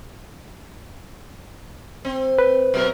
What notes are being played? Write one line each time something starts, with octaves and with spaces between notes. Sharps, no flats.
C4
B4
B2 F#3 A#4